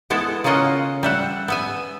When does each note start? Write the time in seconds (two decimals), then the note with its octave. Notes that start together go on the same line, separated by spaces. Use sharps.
0.10 G#3 B3 E4 A4
0.44 C#3 A#3 C#4 F4 D#5 F#5
1.03 G3 E5 F#5
1.48 B3 E5 G#5